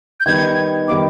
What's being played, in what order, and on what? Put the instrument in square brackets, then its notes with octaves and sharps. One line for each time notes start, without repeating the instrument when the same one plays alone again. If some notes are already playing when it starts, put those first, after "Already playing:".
[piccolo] G6
[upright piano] D#3 G3 B3 D#4 [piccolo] G#6
[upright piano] D#3 G3 B3 D#4 [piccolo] D6